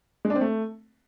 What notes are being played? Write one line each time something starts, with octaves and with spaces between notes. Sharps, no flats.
G#3
D4
C4
A3